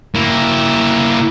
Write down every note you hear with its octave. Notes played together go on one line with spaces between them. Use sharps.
A#3 E4